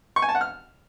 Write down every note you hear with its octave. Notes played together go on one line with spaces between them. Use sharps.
C#6
G#5
A5
F#5
F6